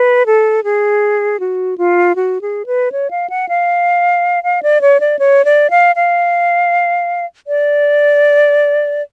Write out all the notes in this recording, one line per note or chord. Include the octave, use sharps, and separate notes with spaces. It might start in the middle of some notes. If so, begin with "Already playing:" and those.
Already playing: B4
A4
G#4
F#4
F4
F#4
G#4
B4
C#5
F5
F#5
F5
F5
D5
C#5
D5
C#5
D5
F5
F5
D5